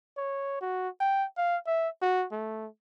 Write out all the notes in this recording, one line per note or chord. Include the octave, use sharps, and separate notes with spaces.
C#5
F#4
G5
F5
E5
F#4
A3